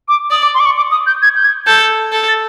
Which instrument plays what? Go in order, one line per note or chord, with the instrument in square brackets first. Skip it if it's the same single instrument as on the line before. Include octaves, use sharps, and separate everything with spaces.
[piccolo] D6
[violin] D5 [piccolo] D#6
[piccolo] D6
C6
D6
C#6
D6
D#6
G6
G#6
G6
G#6
[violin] A4 [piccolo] G6
[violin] A4
[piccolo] A6